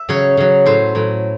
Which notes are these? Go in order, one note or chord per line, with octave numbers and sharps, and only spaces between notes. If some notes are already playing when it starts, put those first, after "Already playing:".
Already playing: E5
C#3 F#3 C#5
C#3 F#3
A2 F#3 C5
A2 F#3